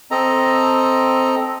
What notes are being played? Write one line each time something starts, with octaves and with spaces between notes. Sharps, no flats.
C4 A4 D#5 A#5